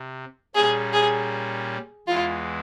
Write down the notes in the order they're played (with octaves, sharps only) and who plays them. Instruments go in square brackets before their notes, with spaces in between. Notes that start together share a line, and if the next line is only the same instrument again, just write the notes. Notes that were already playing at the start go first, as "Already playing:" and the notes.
Already playing: [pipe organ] C3
[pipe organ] A#2 G3 A#3 C#4 [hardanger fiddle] G#4
[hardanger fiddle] G#4
[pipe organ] E2 E3 G#3 [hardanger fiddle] F4